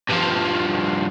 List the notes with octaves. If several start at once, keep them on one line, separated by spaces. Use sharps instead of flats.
G2 F3